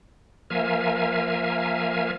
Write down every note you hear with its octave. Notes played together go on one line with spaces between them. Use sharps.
F3 A#3 A#4 E5 F5 G#5